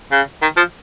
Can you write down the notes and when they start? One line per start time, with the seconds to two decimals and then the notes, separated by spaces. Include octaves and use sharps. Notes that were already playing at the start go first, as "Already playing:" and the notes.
0.12 C#3
0.42 D#3
0.57 F3